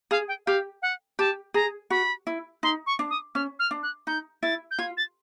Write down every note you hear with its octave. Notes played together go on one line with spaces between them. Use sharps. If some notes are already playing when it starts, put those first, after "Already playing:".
G#4 F5
G5
G4 F5
F#5
G4 A5
G#4 A#5
F#4 B5
E4
D#4 C6
C#6
D4
D#6
C#4 F6
F6
D4
F#6
D#4 G6
E4 A6
G6
F4 G#6
A6